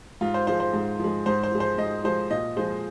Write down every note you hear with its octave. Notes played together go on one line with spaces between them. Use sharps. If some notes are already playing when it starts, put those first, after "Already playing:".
G#2 F4
C5
F3 G#3 C5
C5
G#2
F3 G#3
G#2 C5
C5
F3 G#3
C5
G#2 D#5
F3 G#3 C5
A#2 D#5
F3 G#3 C5